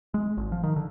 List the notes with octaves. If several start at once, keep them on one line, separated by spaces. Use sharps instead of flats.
G#3
G#1
F3
D#3
D3